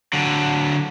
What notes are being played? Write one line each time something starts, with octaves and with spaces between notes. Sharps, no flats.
D3 F#3